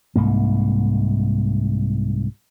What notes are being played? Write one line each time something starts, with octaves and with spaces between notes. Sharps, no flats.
C2 G#2 A#3